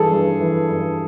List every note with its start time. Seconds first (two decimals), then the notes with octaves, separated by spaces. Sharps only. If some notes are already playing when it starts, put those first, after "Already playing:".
Already playing: G2 E3 G#4 A4
0.12 G2
0.41 E3
0.70 G2